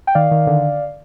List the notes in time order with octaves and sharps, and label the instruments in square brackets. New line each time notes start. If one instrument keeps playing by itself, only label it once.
[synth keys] G5
D#3 D5 F5
D#3
D3